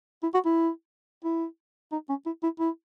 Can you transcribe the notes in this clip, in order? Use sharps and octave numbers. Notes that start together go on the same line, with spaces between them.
E4
F#4
E4
E4
D#4
C#4
E4
E4
E4